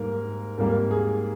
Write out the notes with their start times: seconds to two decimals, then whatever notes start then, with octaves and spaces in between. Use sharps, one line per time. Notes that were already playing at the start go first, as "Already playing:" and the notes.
Already playing: G#2 G3 A#3 A#4
0.58 G#2 G3 A#3 A#4
0.91 G#4